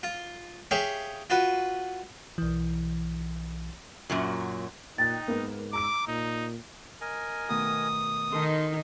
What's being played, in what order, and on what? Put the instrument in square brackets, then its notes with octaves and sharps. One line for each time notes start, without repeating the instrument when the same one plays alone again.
[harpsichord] F4
G4 G#4 C#5 E5 F5
F4 F#4 B4
[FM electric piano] B1 E3
[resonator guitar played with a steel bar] F#2 A#2 F#3
[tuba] A#2 [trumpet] D#4 [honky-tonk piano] G5 F#6 [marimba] A6
[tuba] G#2 [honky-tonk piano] A#3 B3
[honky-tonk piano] A#5 E6 D7 [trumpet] D6
[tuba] A#2 [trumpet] D#4
[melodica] A#4 D#5 G#5
[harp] B2 D#3 A3 [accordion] D#6
[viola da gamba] D#3 D#4 [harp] A4 A#4 A5 [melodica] C6